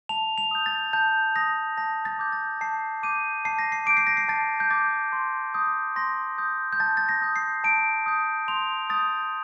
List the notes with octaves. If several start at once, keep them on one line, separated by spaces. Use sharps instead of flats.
A5 F7
F7
D#6 G6
A6
A5 G6
D#6 G6 A#6
A5 A#6
A6
D6 G6
A6
A5 C7
D6 G6 D#7
A5 C7
A#6
C7
D6 G6 D7
C7
A#6
C7
A5 A6
G6
D6 G6 A6
C6
D#6 G6
C6 A#6
D#6 G6
G6
A5 A6
A6
A#6
D#6 G6
C7
A5 D7
D#6 G6
C6 F7
D#6 G6 A6